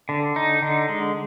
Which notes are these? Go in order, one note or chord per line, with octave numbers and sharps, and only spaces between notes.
D3
D#4
D3
G#3